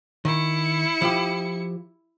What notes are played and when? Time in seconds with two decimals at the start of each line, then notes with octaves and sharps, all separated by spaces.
0.25 D#3 E4 C#7
1.02 F3 F4 G4